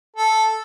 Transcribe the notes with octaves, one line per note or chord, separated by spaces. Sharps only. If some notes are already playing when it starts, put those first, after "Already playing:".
A4